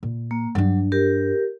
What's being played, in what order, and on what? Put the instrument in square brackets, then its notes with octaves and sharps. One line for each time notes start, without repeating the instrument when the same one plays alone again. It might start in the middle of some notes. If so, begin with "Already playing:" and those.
[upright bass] A#2
[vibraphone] A#3
[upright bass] G2 D4 [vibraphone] F#3
[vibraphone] G4 A#4